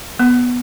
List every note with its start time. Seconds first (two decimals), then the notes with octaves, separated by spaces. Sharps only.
0.19 B3